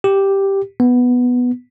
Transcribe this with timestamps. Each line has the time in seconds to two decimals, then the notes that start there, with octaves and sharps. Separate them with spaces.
0.04 G4
0.80 B3